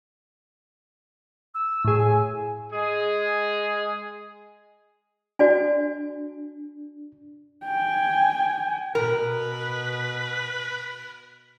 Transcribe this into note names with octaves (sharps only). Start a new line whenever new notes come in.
E6
A2 G#4
G#5
G#3 G#4
D4 F#4 D5 G#5
G5 G#5
B2 A#4 B4